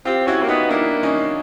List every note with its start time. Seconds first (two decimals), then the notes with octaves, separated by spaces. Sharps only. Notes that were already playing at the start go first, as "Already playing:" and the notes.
0.05 C4 F4 G4
0.27 C#4 E4 F#4
0.43 A#3
0.48 B3 D#4 F4
0.70 A#3 D4 E4
1.03 C#4 D#4